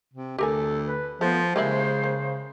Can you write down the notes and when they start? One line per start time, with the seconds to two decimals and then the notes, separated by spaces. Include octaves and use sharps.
0.13 C3
0.38 D2 G4 A4 A#4 G#5
0.86 B4
1.21 F3 A3 B3 C5
1.56 C#3 G3 G#3 A#3 E4
2.04 A#3